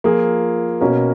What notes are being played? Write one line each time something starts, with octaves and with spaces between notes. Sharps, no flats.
F3 A#3 F4 G#4
B2 A#3 C#4 F#4 A#4